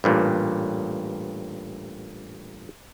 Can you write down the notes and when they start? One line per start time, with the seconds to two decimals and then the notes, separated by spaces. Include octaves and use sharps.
0.04 A1 G2 A#2